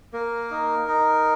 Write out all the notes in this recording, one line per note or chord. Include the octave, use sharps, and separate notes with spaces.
A#3 A#4
D#4
D#4